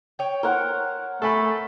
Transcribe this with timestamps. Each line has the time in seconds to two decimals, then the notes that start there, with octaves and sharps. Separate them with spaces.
0.19 C#5 G5
0.43 A#4 C5 C#5 F#5
1.22 A3 A4 G#5 B5